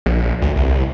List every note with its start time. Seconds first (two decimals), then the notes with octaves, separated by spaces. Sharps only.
0.06 A#1
0.42 D2
0.56 C2